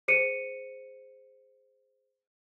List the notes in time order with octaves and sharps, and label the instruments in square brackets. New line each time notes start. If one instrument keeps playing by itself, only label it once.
[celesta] G#4 C5 C#7 D#7